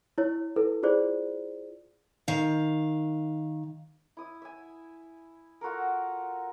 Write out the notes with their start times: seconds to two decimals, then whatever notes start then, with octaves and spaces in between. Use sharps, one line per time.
0.18 E4 C#5
0.56 E4 A4 B4
0.83 E4 F4 G#4 C5 D5
2.28 D#3 F5
4.17 E4 D#6
4.42 E5 G#5
5.61 F4 F#4 A4 A#4